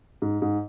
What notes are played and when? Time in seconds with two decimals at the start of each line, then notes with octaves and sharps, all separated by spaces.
0.22 G#2
0.42 G#2